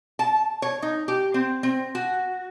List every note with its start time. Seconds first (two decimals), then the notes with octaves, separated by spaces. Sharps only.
0.19 A5
0.62 C#5
0.82 D#4
1.08 G4
1.34 C4
1.63 C4
1.95 F#4